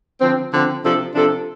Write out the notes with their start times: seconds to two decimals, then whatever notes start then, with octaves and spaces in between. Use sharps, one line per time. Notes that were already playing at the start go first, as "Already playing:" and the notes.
0.20 D3 F3 C4
0.52 D3 F3 C4
0.83 C3 F3 D4 A4
1.14 C3 F3 D4 A4